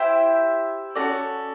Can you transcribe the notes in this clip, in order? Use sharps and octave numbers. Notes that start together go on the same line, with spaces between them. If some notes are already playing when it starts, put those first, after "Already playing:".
Already playing: E4 G4 C5 E5
C#4 F#4 A4 D5